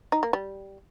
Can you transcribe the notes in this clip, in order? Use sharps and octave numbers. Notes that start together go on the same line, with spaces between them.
D#4
A#3
G3